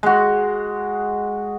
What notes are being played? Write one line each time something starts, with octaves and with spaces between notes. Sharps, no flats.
G#3 F#4